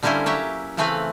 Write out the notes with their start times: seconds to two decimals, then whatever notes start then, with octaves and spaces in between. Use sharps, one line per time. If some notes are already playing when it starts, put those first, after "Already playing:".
0.03 D3 G3 A#3 C#4 E4 C5
0.26 F#3 G4 C#5 E5
0.77 C#3 E3 A3 C4 B4 F5